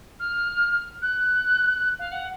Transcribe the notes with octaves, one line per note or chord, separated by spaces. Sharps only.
F6
F#6
F5
F#5